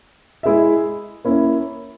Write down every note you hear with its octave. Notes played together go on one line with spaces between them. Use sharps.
G#3 E4 G#4 E5
A#3 C#4 E4